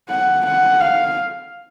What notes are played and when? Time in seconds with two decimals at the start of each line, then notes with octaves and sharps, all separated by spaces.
0.09 F#5
0.45 F#5
0.80 F5